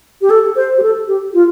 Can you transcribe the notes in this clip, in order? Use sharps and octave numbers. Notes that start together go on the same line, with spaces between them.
G4
A4
C5
G4
A4
G4
F4